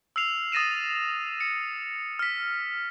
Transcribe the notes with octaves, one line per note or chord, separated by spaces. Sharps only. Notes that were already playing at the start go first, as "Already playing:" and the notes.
E6 F6 C7 F7
D#6 A6 A#6 D#7 E7
C#7
F6 B6